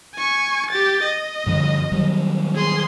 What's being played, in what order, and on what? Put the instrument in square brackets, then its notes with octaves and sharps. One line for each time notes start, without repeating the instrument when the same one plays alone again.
[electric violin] G#5 C#6
G4 A6
D#5
[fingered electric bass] G2 D3 F3
D#3 F#3 G3
[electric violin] G#4 C6